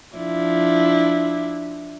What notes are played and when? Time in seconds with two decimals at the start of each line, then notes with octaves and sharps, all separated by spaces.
0.16 F3 D4 E4